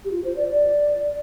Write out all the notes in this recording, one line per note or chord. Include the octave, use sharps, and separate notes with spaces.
G4
F4
C5
D5
D5